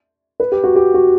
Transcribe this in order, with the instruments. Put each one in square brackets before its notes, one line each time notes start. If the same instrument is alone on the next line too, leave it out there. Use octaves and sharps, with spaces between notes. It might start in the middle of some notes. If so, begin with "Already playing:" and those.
[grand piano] B4
G4
F#4
G4
F#4